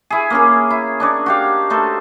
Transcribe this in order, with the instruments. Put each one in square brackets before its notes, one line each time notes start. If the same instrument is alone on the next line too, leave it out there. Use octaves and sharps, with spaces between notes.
[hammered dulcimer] E4 G#4
A#3 C#4 G#4
E4
D4 D#4 C#5
F#4 G4 F5
A3 D#4 A4 C5